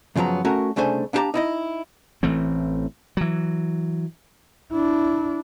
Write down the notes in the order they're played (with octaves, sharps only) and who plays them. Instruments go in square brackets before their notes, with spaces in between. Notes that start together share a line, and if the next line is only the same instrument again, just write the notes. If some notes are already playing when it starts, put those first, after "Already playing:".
[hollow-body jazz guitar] F#2 C#3 F3 F#3 B3 A#5
A3 C#4 F#4 A#4 C#5
C2 C#3 A3 D4 C5 G#5
A#3 D4 E4 G4 A5 A#5
D#4 E4 D#5
[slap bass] A1 E3 A3 C4
E3 F#3
[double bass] D4 E4